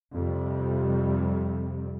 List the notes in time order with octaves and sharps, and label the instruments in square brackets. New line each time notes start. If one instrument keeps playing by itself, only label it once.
[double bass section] F2 C3 G3